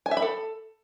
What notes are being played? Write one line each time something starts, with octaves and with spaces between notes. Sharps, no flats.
G#5
E5
B5
A4